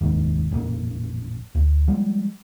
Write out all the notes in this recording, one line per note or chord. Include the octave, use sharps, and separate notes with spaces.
F1 D#2 G#2
A1 F2 A#2
D2
F3 G3 G#3